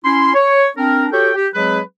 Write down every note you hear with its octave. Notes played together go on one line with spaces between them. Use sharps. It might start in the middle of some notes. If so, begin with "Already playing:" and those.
C#4 E4 C6
C#5
C4 D4 A#4
F#4 G4 A4 C#5 G5
G4
F#3 G#3 C4 G#4 B4